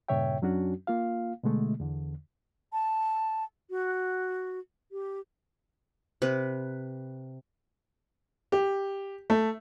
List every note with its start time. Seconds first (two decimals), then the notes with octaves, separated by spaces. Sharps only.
0.08 G2 A#2 C#3 C#5 E5 G5
0.42 F#2 F#3 C#4 D4 F#4
0.87 A#3 F4 F5
1.43 B2 D3 G#3 A3
1.80 E2 D3
2.72 A5
3.70 F#4
4.92 G4
6.22 C3 B4
8.52 G4
9.30 A3